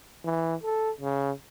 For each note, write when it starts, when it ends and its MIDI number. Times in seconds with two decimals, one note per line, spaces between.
0.24 0.55 52
0.63 0.90 69
1.00 1.31 49